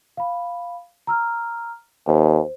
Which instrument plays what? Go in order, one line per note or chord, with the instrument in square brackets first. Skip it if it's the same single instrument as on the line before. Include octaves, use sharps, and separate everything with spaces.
[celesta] F5 B5
A#5 E6 F6
[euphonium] D#2 [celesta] C5